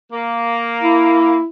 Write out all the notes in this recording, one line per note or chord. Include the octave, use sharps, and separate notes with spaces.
A#3
E4